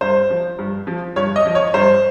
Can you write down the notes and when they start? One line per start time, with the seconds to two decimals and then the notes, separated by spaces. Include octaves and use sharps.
0.01 G2 C5
0.30 F3
0.58 G2
0.87 F3
1.16 G2 C#5
1.36 D#5
1.46 F3
1.55 C#5
1.74 G2 C5